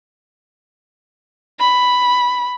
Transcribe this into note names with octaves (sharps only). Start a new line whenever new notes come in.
B5